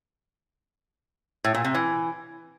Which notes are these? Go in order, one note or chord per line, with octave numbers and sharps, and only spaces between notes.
A2
A#2
C3
E3